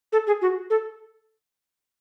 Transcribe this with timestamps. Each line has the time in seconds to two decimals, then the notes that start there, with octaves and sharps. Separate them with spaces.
0.13 A4
0.27 G#4
0.42 F#4
0.70 A4